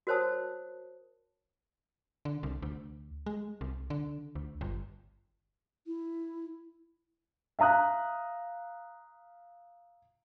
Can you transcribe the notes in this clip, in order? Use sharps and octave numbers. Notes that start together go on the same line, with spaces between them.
F#4 A#4 C5 C#5 A5 D#6
D3
C2
D2
G#3
C2
D3
D2
G1
E4
E5 F5 A#5 D#6 F#6